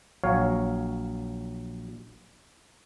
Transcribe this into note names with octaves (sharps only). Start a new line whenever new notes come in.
A#1 F#3 C#5 F5